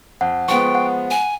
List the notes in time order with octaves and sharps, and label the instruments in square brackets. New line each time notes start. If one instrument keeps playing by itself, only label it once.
[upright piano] F2 [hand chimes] F#5
[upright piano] F3 G#3 B3 [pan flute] G5 [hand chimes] C#6
[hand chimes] F#5
[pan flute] G#5